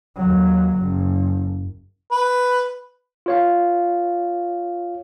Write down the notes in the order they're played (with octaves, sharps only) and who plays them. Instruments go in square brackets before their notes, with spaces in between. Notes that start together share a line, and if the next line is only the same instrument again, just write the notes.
[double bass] D#2 F#3
F#1
[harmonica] B4
[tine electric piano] F4 C#5 F5